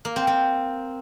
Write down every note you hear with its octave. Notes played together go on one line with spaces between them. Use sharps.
A#3
C4
C4